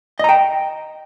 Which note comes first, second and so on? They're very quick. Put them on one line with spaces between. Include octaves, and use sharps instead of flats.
D#5 A#5 G5